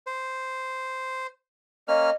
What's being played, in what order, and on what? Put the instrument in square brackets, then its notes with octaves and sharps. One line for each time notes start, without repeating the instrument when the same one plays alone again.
[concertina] C5
[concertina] A#3 C#4 F6 [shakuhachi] D#5